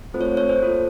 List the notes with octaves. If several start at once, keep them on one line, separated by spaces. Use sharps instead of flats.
A3 C4 F4 A4 C5
C#5
C5
C#5
C5
A#3 F4 A4